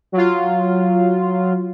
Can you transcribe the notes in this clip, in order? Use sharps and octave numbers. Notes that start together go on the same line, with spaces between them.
F#3 F4